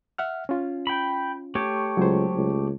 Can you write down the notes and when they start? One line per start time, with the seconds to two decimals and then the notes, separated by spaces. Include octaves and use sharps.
0.18 E5 F#5 F6
0.49 C#4 F4
0.87 G5 B5
1.55 A3 G4 C#5
1.97 C#2 F#3 C5
2.34 C#2